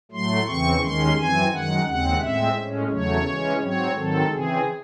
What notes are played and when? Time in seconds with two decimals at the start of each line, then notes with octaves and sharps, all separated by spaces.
0.11 A2 F#3 A3 C6
0.47 E2 C#3 E3 C4 C#6
0.82 D#2 D#3 G#3 C#4 C6
1.16 F#2 E3 C4 G#5
1.51 F#2 D#3 G#3 F#5
1.86 D#2 C#3 G#3 C4 F#5
2.20 A2 G#3 C4 E5
2.56 A2 G#3 C#4
2.90 E2 C#3 F#3 A3 C#5
3.25 C#3 E3 G#3 C#4
3.60 G#2 F#3 C4 C#5
3.95 G#2 D#3 F#3 C4 A4
4.30 C#3 E3 C4 G#4